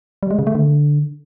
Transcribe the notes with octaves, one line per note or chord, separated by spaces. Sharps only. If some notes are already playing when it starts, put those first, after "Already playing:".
G3
G#3
C#3
A3
D3